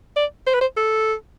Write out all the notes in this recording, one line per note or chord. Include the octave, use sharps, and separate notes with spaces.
D5
C5
B4
C5
A4